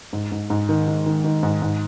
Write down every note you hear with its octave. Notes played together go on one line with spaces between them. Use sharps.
G#2
G#2
G#2
D#3
D#3
D#3
D#3
G#2
G#2